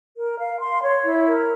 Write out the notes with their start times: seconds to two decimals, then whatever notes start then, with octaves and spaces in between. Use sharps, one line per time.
0.15 A#4
0.38 F5
0.60 C6
0.81 C#5
1.04 E4
1.25 A#4